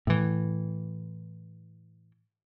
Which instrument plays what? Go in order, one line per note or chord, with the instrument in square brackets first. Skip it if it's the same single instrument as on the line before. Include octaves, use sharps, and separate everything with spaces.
[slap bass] A2 E3